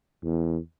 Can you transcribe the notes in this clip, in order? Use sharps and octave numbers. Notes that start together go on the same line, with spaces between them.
E2